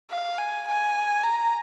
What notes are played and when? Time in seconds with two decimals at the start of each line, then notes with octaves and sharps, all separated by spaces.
0.11 F5
0.38 G#5
0.67 G#5
1.23 A#5